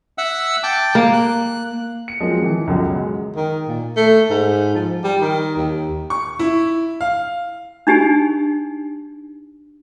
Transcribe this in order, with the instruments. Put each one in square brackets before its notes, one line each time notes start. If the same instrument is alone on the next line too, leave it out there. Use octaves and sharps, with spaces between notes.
[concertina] E5 F#5 E6
G5 A5 D6
[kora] A#3
[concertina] F#6
[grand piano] C#7
F3 F#3 G#3 A#3 C4
D#3 E3
C#2 F#2 B2 D3
F#3 G#3
[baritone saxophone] D#3
A#2
A3
G#2
F3
G3
D#3
D#2
[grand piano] C#6
E4
F5
[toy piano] D4 D#4 G4 G#5